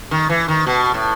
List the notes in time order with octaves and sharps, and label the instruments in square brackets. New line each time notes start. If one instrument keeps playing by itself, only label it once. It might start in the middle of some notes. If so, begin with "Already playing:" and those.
[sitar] D#3
E3
D#3
B2
A2